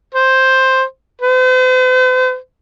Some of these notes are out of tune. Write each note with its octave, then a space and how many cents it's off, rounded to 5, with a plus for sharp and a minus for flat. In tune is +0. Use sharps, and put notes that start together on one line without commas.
C5 +5
C5 -45